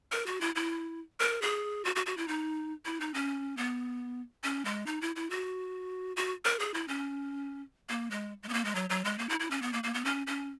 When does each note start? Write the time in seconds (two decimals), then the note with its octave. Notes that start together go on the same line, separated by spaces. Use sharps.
0.12 A#4
0.26 F#4
0.41 E4
0.55 E4
1.20 A#4
1.42 G#4
1.85 F#4
1.96 F#4
2.06 F#4
2.17 E4
2.28 D#4
2.85 E4
3.00 D#4
3.14 C#4
3.57 B3
4.44 C#4
4.65 G#3
4.86 D#4
5.01 E4
5.16 E4
5.30 F#4
6.17 F#4
6.45 A#4
6.59 G#4
6.74 E4
6.88 C#4
7.89 A#3
8.11 G#3
8.43 G#3
8.49 B3
8.54 A#3
8.65 G#3
8.75 F#3
8.90 F#3
9.05 G#3
9.19 A#3
9.29 E4
9.40 E4
9.51 C#4
9.62 B3
9.73 A#3
9.84 A#3
9.94 B3
10.05 C#4
10.27 C#4